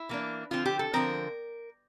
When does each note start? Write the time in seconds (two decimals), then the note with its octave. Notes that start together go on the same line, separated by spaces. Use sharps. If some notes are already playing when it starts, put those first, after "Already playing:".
Already playing: E4
0.09 E3 A#3 D4
0.51 D3 F3 C4 F4
0.65 G4
0.79 A4
0.93 D3 F3 C4 A#4